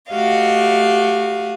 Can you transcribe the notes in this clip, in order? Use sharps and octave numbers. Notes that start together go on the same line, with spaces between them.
A3 F#4 G4 D#5 F5